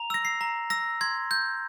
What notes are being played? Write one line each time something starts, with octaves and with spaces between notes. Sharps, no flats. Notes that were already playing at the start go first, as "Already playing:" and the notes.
Already playing: A#5 F7
E6 A#6
C7
A#5
E6 A#6
C6 G#6
G6